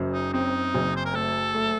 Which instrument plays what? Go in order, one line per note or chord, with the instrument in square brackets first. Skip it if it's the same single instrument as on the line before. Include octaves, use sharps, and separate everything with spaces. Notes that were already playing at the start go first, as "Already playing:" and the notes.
Already playing: [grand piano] F#1 F#2
[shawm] D#4
[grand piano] C4 [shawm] D#4
[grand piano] F#1
[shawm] C5
A#4
[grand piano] A3 [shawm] A4
[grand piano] A3